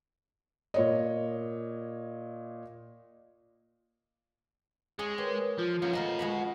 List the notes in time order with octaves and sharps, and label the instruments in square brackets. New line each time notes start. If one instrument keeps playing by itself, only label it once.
[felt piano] A#2 C#5 D#5
[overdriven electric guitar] G#3 [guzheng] G#4 C#5
[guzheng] G4 [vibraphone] A#4 B4 C#5
[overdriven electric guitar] F3 [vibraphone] F4
[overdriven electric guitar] F3 C#4 [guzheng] A#3
[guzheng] A3 A#4 C6 [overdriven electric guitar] D#5 F#5
[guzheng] G#3 F#4 B5